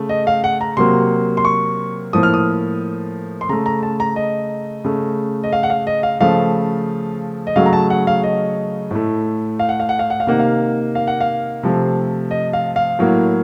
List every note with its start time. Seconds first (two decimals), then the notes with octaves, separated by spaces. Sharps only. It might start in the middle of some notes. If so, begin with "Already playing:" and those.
Already playing: C#3 A3
0.09 D#5
0.27 F5
0.44 F#5
0.61 A#5
0.77 C3 F#3 A#3 C6
1.37 C6
1.45 C#6
2.13 A2 F3 A#3 D#6
2.23 F6
2.34 D#6
3.41 C6
3.49 C#3 A3 A#5
3.66 A#5
3.83 A5
4.00 A#5
4.16 D#5
4.84 C#3 A3
5.44 D#5
5.53 F5
5.63 F#5
5.70 F5
5.87 D#5
6.03 F5
6.21 C#3 F3 A3 F5
7.47 D#5
7.56 C#3 F#3 A3 F5
7.66 A#5
7.73 A5
7.90 F#5
8.07 F5
8.23 D#5
8.91 A2 A3
9.59 F5
9.69 F#5
9.80 F5
9.89 F#5
9.99 F5
10.10 F#5
10.20 F5
10.27 C3 D#3 A#3 F#5
10.39 F5
10.95 F5
11.07 F#5
11.21 F5
11.63 C3 F3 A3
12.31 D#5
12.53 F5
12.76 F5
12.99 A2 F#3 A#3